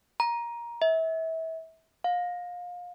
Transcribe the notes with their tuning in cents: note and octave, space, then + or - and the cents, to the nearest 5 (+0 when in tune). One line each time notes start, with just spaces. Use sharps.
A#5 +15
E5 -30
F5 +30